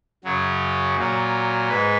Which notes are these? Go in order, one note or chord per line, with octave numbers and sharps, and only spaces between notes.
F#2 C#3 F#3
A#2 F#3
G#2 B4